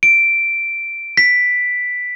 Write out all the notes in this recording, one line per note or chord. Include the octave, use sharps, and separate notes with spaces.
D7
B6